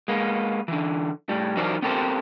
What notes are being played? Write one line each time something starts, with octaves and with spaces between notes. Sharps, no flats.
G#3 A#3 B3
D3 E3
A2 G3
E3 F#3 D#4 A#4 C5 D5
B3 C4 G4 A4 A#4 C5